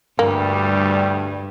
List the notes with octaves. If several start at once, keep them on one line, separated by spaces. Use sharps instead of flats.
D2 G2 G3 A#3